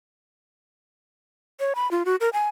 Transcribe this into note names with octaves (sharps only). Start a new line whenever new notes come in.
C#5
B5
F4
F#4
A#4
G#5